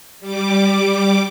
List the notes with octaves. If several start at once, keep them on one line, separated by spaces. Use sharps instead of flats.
G3 D6